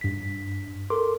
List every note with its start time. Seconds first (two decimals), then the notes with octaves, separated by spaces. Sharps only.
0.01 G2 B6
0.90 A4 A#4 C6 D6